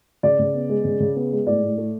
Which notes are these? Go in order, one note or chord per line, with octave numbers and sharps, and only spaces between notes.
C#3 D5
C#3
B3
G#3
C#3
C#3
B3
G#3
A2 D5
A2
A3